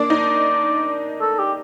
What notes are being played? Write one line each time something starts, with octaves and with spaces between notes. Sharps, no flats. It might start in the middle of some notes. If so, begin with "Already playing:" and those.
Already playing: A#3 D4 D5
D#4
A4
G4